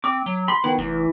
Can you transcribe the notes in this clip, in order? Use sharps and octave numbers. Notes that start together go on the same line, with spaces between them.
C4 D6
F#3
B5 C6
D#3 B3 E4
F1 E3